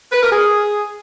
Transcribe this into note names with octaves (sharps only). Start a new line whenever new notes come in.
B4
A#4
G#4